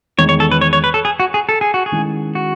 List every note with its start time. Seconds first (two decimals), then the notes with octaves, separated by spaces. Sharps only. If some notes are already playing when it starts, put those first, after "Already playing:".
0.18 E2 D#3 G#3 C#5
0.29 C#5
0.40 A4
0.51 B4
0.61 C#5
0.73 C#5
0.84 B4
0.94 A4
1.05 G#4
1.20 F#4
1.34 G#4
1.49 A4
1.61 G#4
1.74 F#4
1.86 G#4
1.92 D#3 G#3 C#4 E4
2.35 F#4